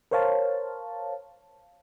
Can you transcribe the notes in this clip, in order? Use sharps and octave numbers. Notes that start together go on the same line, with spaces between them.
A#4 C5 C#5 F5 A5